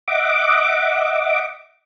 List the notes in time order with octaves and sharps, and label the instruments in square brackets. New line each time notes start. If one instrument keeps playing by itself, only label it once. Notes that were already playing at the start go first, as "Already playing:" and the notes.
[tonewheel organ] D#5 E5 F#5 D6